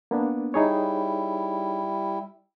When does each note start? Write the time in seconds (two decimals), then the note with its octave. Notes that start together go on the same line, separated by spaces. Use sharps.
0.11 A#3 B3 D4
0.54 G3 D#4 E4 G#4 C#5